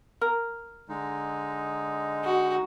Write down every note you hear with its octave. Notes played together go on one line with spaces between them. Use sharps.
A#4
D3 G#3 D#4
F#4